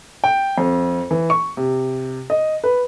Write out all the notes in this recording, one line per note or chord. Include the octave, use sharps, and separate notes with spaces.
G5
F2
E3
C#6
C3
D#5
B4